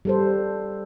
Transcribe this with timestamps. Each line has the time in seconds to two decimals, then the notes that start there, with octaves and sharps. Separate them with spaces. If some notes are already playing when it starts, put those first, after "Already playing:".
0.05 G3 A4 C5